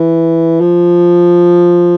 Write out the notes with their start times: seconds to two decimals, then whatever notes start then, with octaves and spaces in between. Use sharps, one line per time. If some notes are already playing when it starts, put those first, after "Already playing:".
Already playing: E3
0.61 F3